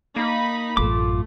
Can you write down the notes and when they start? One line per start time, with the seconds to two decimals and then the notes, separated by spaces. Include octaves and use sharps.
0.16 A#3 D#4 B5
0.77 A1 F#2 A3 F4 D6